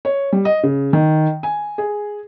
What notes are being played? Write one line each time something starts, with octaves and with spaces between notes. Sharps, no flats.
C#5
G3
D#5
C#3
D#3
G#5
G#4